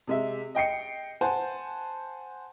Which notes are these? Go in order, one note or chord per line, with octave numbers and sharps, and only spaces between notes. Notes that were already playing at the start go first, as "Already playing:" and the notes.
C3 G#3 E5
D#5 G5 C7 C#7
C5 F#5 G#5 A5